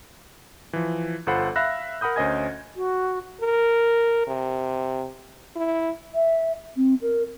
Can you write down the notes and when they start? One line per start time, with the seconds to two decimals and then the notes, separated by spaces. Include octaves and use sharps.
0.73 E3 F3
1.27 G1 F4 A4 C5 F#5 B5
1.56 E5 F5 B5 E6 F#6 A#6
2.01 A#4 F#5 B5 D#6 G6
2.16 D2 C#4 C5 D#5 G#5 G#6
2.76 F#4
3.41 A#4
4.27 C3
5.56 E4
6.15 E5
6.77 C4
7.02 A#4